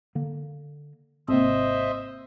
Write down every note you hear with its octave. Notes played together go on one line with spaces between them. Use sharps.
D3 A#3
G#1 C3 A#3 C4 C5 D#5 E5